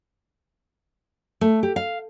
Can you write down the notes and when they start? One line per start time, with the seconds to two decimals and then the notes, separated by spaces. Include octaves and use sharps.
1.41 A3
1.63 G4
1.76 F5